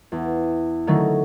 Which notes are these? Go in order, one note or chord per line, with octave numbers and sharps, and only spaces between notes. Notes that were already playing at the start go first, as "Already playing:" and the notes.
E2
D3 D#3 F#3 A3 C#4 D#4